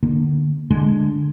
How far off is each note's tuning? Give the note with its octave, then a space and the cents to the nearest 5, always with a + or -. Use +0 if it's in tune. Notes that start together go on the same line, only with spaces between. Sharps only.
D3 +25 A#3 +0
D3 +0 G#3 +0